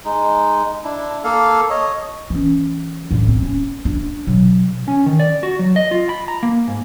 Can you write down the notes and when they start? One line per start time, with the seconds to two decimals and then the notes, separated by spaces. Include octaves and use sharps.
0.05 G#3 D#4
0.84 D4 E4
1.24 A#3 A4 F5
1.70 C#5 D#5
2.30 E3 C#4
3.11 A2 D3
3.28 C4
3.42 C#4
3.85 D4
4.27 B2 F#3
4.88 C#4
5.06 D#3
5.20 D5
5.43 F#4
5.59 F#3
5.76 D#5
5.91 F4
6.09 B5
6.28 A#5
6.43 A#3
6.67 G#2